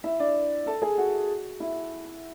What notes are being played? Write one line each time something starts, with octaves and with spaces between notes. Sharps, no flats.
E4 E5
D4 D5
A4 A5
G#4 G#5
F#4 F#5
E4 E5